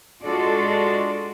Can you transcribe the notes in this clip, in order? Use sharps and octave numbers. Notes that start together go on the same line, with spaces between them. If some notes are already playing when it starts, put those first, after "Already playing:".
G#3 D4 F4 F#4 A4 D5